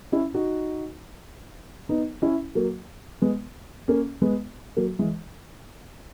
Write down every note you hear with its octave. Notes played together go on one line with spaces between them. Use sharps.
C#4 E4
D#4 F#4
B3 D#4
C#4 E4
F#3 A#3
G#3 B3
A#3 C#4
G#3 B3
F#3 A#3
E3 G#3